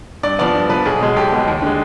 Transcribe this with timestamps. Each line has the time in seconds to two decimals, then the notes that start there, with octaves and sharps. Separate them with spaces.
0.23 G2 D5
0.39 F3 B3 D5
0.55 G2
0.70 F3 B3 B4
0.85 B1 G#4
1.01 B2 G#3
1.16 B1 G4
1.32 B2 G#3
1.48 D#2
1.62 D3 G#3